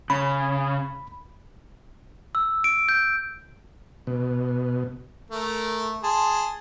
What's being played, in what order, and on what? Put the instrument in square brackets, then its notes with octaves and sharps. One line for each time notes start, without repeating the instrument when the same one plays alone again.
[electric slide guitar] C#3 [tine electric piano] B5
[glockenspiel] E6
D7
G6
[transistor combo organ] B2
[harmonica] A3 A#4
G#4 A5 C6